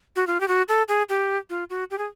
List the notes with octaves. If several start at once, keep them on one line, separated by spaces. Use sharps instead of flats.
F#4
F4
G4
F#4
A4
G#4
G4
F4
F#4
G4
G#4